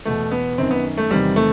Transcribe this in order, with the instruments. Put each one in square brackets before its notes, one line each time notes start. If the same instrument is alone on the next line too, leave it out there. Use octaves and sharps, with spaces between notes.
[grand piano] E2 B2 A3
B3
F#2 D#3 C4
B3
A3
E2 C3 D#3 G3
A3